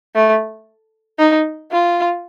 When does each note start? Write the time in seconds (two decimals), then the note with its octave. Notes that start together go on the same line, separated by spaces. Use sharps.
0.15 A3
1.19 D#4
1.72 F4